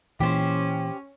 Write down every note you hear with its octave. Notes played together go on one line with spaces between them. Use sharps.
A#2 E3 C#4 G4 C5